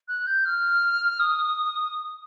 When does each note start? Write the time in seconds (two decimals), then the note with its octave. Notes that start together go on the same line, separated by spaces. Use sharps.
0.08 F#6
0.27 G6
0.45 F6
1.20 D#6